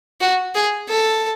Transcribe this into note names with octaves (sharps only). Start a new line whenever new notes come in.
F#4
G#4
A4